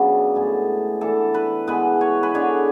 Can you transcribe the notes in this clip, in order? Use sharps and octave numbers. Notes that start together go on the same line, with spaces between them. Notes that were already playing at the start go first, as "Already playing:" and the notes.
Already playing: C#3 F#3 B3 D4
A2 G#3 B3
E3 B3 D4 A4
B4
E3 G#3 B3 B4
C#5
B4
D3 G#3 D4 C#5